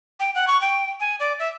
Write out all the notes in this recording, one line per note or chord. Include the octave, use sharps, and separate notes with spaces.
G5
F#5
C#6
G5
G#5
D5
E5